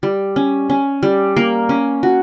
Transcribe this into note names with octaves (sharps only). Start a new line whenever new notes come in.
G3
C#4
C#4
G3
A#3
C#4
F#4